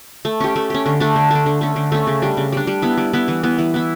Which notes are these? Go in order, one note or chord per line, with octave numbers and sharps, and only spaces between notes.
A3
C#4 G4
A3
C#4 G4
D3
A3 D4
D3
A3 D4
D3
A3 C#4
D3
A3 C#4
C#3
G3 D4
C#3
G3 D4
G3
B3 E4
G3
B3 E4
E3
B3 E4
E3
B3 E4